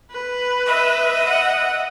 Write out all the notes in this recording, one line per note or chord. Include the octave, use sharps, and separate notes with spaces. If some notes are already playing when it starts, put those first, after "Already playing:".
B4
D#5 E5
F#5